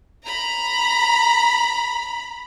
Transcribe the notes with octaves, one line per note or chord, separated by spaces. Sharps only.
A#5 B5